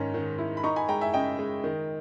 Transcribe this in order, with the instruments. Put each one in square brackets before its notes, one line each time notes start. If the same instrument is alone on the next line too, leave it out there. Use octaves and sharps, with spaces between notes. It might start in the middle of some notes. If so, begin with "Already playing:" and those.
Already playing: [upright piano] G#2 D#3 C#4
D#3
E4
B5
D#4 A#5 C#6
G#5 B5
G#3 G5 A#5
E5 G#5
C#3 D#5 G5
G#3
D#3